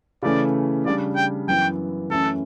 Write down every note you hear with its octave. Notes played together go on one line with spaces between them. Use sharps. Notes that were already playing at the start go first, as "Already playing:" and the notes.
C#3 E3 A3 C#4 D5
C#3 G3 D4 D5
G5
F#2 E3 B3 G5
F#2 E3 A3 C#4 E4 A4